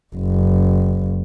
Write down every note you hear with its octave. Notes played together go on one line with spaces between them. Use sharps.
F#1